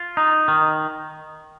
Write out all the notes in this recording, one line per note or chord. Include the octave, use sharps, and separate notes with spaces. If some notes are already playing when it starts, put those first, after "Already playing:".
Already playing: F4
D#4
D#3